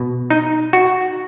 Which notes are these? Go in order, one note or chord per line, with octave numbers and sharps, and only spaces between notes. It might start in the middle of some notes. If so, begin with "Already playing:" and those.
Already playing: B2
D#4
F#4